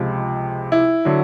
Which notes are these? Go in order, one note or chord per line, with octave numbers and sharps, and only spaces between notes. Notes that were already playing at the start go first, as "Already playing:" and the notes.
Already playing: C#2 C3 F3 G#3
E4
D3 F#3